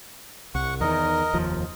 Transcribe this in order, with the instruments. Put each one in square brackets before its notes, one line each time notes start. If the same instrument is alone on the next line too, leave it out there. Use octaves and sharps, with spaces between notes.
[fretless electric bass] C2 [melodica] F#5 C#6
[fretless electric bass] E2 D#3 [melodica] A#4 D#5
[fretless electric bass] F1 D#2 F3